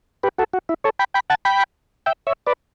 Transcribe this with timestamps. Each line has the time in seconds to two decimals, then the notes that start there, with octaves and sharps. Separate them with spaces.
0.23 G4 B4
0.38 F#4 A4
0.53 F#4
0.69 E4
0.84 A4 C#5
0.99 G5 B5
1.14 G5 B5
1.30 F#5 A5
1.45 G5 B5
2.06 E5 G5
2.27 C#5 E5
2.47 B4 D5